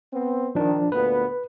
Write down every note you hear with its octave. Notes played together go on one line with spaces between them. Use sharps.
B3 C4
D#3 F3 D4
D2 A#2 B3 B4